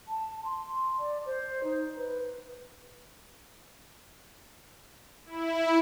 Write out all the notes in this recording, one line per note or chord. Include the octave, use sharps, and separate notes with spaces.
A5
C6
D5
C5
D#4
B4
E4